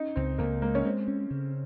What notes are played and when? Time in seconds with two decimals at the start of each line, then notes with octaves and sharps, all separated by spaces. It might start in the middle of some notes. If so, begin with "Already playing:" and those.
Already playing: C#4 D#4
0.16 C#2 C4
0.38 C#2 A#3
0.62 G#3 A#3
0.75 C#4
0.84 G#3 C4
1.08 C#4
1.31 C#3